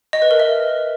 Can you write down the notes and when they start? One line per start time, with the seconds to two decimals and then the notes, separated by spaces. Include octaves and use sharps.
0.13 D#5
0.22 B4
0.31 A#4
0.40 E5